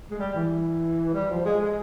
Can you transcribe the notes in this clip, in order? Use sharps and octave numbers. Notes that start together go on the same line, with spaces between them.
G#3
G3
E3
G3
F3
G#3
G#3